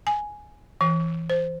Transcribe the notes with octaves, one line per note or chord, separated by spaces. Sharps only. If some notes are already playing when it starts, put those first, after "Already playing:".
G#5
E3
C5